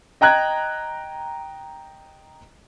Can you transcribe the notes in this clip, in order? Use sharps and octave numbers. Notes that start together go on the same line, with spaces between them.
D#5 G5 A#5 F#6 G#6